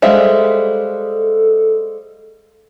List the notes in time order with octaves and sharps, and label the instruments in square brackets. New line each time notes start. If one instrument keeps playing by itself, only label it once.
[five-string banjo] G3 G#3 E5 [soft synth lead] A4 [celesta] C5 F5